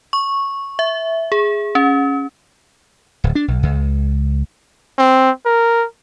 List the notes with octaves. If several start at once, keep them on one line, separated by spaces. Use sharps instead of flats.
C#6
E5
G#4
C#4
D1
D4
B1
C#2
C4
A#4